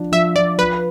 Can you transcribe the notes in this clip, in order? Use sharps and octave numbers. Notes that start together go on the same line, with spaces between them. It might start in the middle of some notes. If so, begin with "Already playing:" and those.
Already playing: F3 D4
F3 E5
F3 D5
F3 B4